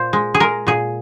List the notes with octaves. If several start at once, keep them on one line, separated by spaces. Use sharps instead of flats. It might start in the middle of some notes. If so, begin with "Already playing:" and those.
Already playing: A#2 C5
G#3
G#4
G#3 A#4
A#2 G#4